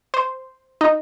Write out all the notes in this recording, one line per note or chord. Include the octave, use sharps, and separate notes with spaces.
C5
D#4